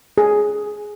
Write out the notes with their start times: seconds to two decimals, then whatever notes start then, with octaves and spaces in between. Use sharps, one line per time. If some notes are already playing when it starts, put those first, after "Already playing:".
0.18 G#4